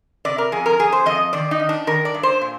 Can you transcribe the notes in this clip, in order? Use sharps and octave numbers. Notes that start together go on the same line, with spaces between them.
C3 D5
A#4
F2 G#4
A#4
F2 G#4
C5
F2 D#5
D#3 D5
D#4
D#3
D4
D#3 A#4
D5
G2
C5
A#2